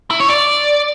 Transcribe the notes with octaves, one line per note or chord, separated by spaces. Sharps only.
E4
C#5
D5